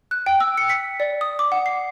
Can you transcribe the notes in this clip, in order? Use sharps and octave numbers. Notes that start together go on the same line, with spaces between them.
F#6
G5
E6
C#7
B6
D5
D#6
D6
F#5
C7